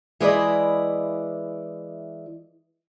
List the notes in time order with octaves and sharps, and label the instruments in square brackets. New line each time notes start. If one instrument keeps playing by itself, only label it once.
[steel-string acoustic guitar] E3 G#3 E4 B4 D5 D#5